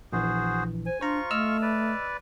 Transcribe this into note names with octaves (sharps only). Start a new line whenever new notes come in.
A#1 E3 F#4 G#4 C5
C5 G#5
D4 F4 C5 A#5 C#6
A3 D#5 E6 F6
B4 D5